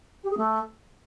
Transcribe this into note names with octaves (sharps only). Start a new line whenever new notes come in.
G4
G#4
A3